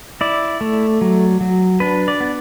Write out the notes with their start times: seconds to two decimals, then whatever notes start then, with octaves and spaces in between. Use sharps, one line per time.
0.21 E4 D5
0.61 A3
1.01 F#3
1.41 F#3
1.80 D4 B4
2.08 D5
2.20 B3